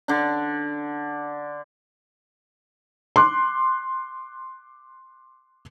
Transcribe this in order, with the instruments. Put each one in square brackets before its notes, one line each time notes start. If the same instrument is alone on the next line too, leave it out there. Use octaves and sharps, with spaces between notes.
[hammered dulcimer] D3 D4
[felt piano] C6 D6 F#6